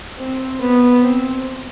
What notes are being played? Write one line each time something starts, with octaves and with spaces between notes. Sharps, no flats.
C4
B3
C4